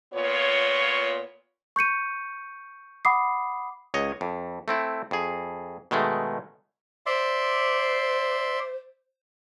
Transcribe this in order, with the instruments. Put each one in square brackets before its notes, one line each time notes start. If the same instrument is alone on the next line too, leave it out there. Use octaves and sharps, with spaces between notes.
[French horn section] A#2 B3 F4 C#5
[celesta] C#6 G6 C#7 D#7
F#5 B5 D6 D#6 C7
[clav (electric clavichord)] C#2 C#5 D#5
F2
A3 C4 E4
F2 G#4
B2 D#3 G#3 A3
[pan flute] C5 [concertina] D5 E5 C6